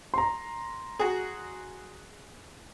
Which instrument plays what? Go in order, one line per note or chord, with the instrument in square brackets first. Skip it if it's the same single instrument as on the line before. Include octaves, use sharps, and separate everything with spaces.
[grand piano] A#5 C6
[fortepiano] F#4 G#4